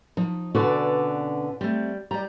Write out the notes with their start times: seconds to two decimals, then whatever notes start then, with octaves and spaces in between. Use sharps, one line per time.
0.17 F3 D#4
0.55 B2 D3 C#4 F#4 B4 D5
1.61 G3 A3 C4
2.11 G3 D5 A#5